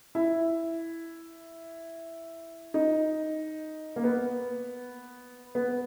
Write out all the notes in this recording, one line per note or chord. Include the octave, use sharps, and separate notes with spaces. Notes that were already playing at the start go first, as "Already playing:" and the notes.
E4
D#4
A#3
B3
B3